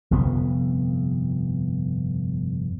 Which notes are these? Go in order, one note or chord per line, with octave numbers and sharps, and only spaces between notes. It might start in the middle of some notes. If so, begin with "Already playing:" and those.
G1 F2 C3 B3